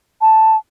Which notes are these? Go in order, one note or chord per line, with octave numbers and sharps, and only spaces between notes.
A5